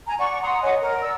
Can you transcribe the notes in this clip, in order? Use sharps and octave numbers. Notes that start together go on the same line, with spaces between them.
G#5 A#5
D5 F#5 C#6
F#5 A#5 C6 D#6
C#5 D#5 F#5 G#5
A#4
D5 E6